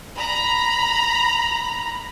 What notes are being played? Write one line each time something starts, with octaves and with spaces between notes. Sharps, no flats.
A#5 B5